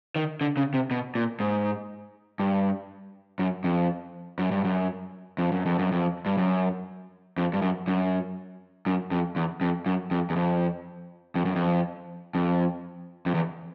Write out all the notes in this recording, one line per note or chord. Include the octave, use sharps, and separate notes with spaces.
D#3
D3
C#3
C3
B2
A#2
G#2
G2
F#2
F2
F#2
G2
F#2
F2
F#2
F2
F#2
F2
G2
F#2
F2
G2
F#2
F#2
F#2
F2
E2
F2
F#2
F2
E2
F2
F2
F#2
F2
F2
F2
E2